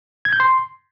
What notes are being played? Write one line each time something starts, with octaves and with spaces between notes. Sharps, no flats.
G#6
G6
C6